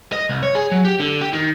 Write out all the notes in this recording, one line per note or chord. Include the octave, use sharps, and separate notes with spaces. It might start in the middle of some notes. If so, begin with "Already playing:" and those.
D#5
C2
C#5
G#4
F#3
G4
D3
G4
D#3